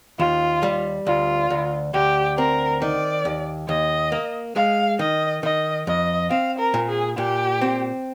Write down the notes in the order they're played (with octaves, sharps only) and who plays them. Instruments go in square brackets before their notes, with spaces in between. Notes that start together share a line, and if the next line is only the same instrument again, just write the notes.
[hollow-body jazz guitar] D#2 [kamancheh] F4
[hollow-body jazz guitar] G3
[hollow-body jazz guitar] D2 [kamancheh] F4
[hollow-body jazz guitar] D2
[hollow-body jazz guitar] D2 [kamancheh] G4
[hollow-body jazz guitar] C4 [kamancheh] A#4
[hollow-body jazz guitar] D#3 [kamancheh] D5
[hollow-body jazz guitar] D#2
[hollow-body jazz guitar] D#2 [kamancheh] D#5
[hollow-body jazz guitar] A#3
[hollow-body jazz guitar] G#3 [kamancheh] F5
[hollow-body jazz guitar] D#3 [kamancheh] D#5
[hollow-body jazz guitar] D#3 [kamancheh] D#5
[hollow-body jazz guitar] F2 [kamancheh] D#5
[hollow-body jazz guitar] C4 [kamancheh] F5
[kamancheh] A#4
[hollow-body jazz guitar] A#2
[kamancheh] G#4
[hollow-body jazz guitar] A#2 [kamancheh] G4
[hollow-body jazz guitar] C4